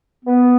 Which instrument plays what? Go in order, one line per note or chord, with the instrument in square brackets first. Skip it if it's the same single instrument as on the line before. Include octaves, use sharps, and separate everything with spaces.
[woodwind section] B3